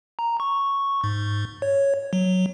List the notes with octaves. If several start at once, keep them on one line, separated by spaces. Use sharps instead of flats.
A#5
C#6
G#2
C#5
F#3